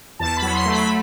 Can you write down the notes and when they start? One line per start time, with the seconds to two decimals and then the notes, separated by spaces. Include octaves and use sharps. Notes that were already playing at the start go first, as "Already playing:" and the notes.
0.19 E2 A5
0.37 B5
0.42 F#3
0.54 C6
0.66 A3
0.71 B5